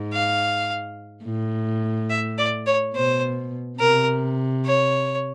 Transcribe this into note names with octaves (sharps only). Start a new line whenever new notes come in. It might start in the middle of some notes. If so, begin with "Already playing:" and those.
Already playing: G#2
F5
A2
E5
D5
C#5
B2 C5
C3 A#4
C#5